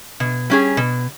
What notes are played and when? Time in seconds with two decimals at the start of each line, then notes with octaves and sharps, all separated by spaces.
0.20 B2
0.50 G3 C#4 G#4
0.77 B2